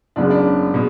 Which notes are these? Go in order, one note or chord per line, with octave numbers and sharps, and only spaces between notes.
F#1 F#2 C#3 G#3 B3 D4
D4
B2 G#3